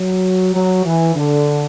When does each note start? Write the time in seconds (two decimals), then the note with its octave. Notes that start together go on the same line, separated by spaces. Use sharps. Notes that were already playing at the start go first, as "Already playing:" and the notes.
Already playing: F#3
0.54 F#3
0.85 E3
1.15 D3